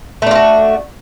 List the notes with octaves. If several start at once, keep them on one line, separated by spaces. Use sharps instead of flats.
A3 D4 F4 F#4